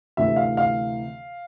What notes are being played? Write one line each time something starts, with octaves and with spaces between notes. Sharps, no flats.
D2 C3 E3 E5
F5
F5